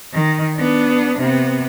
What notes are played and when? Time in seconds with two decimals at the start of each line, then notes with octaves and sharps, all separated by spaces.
0.14 D#3
0.57 B3 D4
1.19 C3 B3